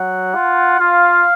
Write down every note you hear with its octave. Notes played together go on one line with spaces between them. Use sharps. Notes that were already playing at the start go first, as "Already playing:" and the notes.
Already playing: F#3 F#5
F4
F4 F5